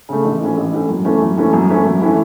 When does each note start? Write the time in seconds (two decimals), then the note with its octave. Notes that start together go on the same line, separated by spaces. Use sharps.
0.09 C#3 A3
0.24 A1
0.41 A2 E3 C#4
0.57 A1
0.73 A2 E3 C#4
0.89 F#2
1.05 E3 A3 C#4
1.21 F#2
1.37 E3 A3 C#4
1.53 F#2
1.70 E3 A3 C#4 E4
1.85 F#2
2.02 E3 A3 C#4 E4